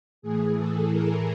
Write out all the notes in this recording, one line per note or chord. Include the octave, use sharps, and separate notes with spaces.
A2 E3 G#4
A4
G#4 A#4